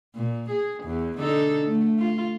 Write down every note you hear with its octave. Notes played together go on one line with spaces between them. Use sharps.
A#2
G#4
E2
D3 D#4 A4
A3
F4